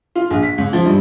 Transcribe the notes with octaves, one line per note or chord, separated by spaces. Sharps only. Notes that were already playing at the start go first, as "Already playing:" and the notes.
F4
A#1
B6
C#2
F3
G2